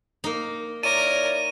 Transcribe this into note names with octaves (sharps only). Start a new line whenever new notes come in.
A#3 D#4
E4 A#4 C#5 D5 D#7